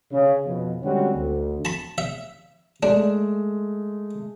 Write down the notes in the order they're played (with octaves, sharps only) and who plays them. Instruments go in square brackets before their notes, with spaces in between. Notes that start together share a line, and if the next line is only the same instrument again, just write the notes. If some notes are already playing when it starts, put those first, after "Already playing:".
[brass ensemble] C#3
F2 B2
D3 G3 G#3 C4 C#4 F#4
D2
[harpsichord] A5 B5
E5
[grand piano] G#3 A3 [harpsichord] D4